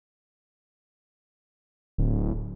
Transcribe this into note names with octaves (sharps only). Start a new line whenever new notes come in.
D1